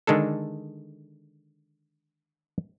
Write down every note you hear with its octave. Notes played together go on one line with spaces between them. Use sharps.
D3 D#3 G#3 D4 A4